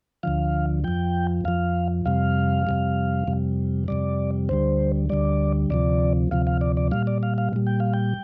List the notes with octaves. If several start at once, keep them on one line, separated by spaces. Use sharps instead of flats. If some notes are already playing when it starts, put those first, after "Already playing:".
D2 D3 F3 F5
F2 F3 G5
F2 F3 F5
F2 C3 G3 F5
F2 C3 G3
F2 C3 G3
F2 C3 G3 D5
D2 D3 G3 C5
D2 D3 G3 D5
D2 C3 F3 D5
D2 C3 F3 F5
F5
D5
D5
A#2 G3 F5
D5
F5
F5
A#2 G3
G5
F5
G5